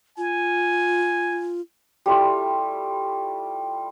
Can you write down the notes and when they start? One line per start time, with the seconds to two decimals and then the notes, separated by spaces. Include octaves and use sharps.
0.17 F4 G#5
2.06 G3 A3 E4 F4